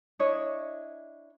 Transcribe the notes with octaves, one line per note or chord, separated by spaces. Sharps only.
D4 E4 C#5 D#5